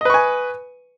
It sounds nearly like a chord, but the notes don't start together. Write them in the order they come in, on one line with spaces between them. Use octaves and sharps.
D#5 B4 C#6 G#5